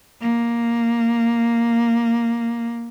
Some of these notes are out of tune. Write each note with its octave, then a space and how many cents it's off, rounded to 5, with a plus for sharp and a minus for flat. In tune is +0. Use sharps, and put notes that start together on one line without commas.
A#3 +0